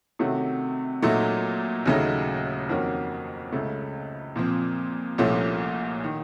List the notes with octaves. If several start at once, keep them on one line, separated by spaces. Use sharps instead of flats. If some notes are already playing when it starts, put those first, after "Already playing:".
C3 D#3 A3 C#4 F#4
A#2 F#3 A3 D#4
D#2 C#3 F#3 A3 D#4
F2 D#3 A#3 C#4 F#4
C#2 C#3 A3
A#2 F3 C4
C2 A#2 F3 A3 C#4
D#3